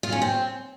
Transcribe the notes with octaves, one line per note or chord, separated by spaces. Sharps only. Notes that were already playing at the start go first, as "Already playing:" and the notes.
F4
C#4
C4